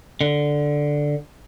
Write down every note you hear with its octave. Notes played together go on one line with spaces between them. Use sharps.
D3